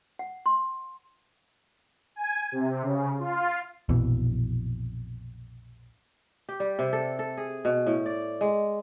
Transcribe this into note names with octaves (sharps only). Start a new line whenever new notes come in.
F#5
C6
G#5
C3
C#3
F4
A#1 F2 B2 E3
G4
G3
C3
A4
A4
G#4
B2
A2
D5
G#3